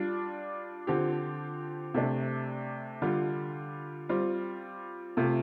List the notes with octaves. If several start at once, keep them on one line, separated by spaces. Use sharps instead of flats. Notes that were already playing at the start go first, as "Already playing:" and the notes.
Already playing: G3 D4 F4
D3 F3 C4 G4
C3 A3 D4
D3 G3 F4
G3 C4 F4
C3 A3 F4